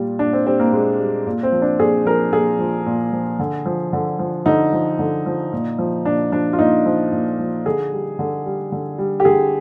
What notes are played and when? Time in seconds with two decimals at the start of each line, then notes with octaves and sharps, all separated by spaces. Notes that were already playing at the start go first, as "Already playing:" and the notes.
Already playing: A#2 G3
0.19 A#2 D4
0.33 C4
0.46 G3 C4
0.60 A#3
0.72 A#2 G#3
0.99 G3
1.27 A#2
1.43 C4
1.52 F3
1.62 D4
1.79 A#2 G#4
2.05 F3 A#4
2.32 A#2 G#4
2.59 F3
2.86 A#2
3.12 F3
3.39 D3
3.66 F3
3.93 D3
4.19 F3
4.46 D3 D#4
4.73 F3
4.99 D3
5.26 F3
5.53 A#2
5.79 F3
6.05 A#2 D4
6.32 F3 D4
6.53 F4
6.59 A#2 D#4
6.86 F3
7.12 A#2
7.39 F3
7.66 D3 G#4
7.92 G3
8.19 D3
8.46 G3
8.72 D3
8.98 G3
9.20 G4
9.25 D3 G#4